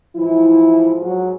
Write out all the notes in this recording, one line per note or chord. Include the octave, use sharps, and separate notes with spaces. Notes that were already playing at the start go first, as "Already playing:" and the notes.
G#2 E3 F3 E4
F#3 F#4